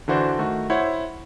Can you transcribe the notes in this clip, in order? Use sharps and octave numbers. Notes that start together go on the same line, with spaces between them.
D3 E3 F#4 C5 D5
D#3 A3 F#4
E4 C5 C#5 F#5